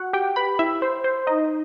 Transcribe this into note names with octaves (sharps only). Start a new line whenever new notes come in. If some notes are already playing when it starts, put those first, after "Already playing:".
Already playing: F#4 F#5
G4 G5
B4 B5
E4 E5
C5
C5
D#4 D#5